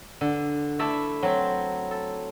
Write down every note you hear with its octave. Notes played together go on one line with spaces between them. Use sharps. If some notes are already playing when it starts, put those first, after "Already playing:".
D3
A3 E4 A4 D5 E5
F#3 C4 B5
A4